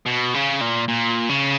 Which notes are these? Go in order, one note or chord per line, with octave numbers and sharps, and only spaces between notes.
B2
C#3
A#2
A#2
C#3